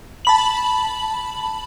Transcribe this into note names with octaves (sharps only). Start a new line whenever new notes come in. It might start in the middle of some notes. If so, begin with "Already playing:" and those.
A5 B5 F#7